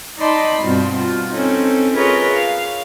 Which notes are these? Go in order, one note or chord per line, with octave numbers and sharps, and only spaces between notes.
D#4 D5 D#5 A5 B5 C6
G2 B2 C4 F4
F4
C4 C#4 D#4 A4
F4 G#4 A#4 B4 C#5 D#5
F5